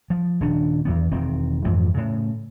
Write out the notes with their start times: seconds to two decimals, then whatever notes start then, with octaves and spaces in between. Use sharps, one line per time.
0.10 F3
0.41 D#1 D#2 C#3 D4
0.85 E2 E3 B3
1.11 E1 D#3 C4
1.65 F2 G#2 E3 F3
1.94 A2 C#3